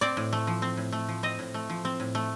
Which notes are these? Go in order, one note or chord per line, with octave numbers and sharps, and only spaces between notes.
C4 D5
A2
A3
F3
C4
A2
A3
F3
C4 D#5
A2
A3
F3
C4
A2
A3